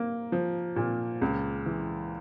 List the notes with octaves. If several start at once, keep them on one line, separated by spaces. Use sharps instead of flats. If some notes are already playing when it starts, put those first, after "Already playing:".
Already playing: A#3
F3
A#2
C#2
E3